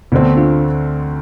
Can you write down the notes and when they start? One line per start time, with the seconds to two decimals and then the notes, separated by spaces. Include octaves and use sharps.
0.12 D2 D3 A3 B3 C4 D4
0.37 D4 F4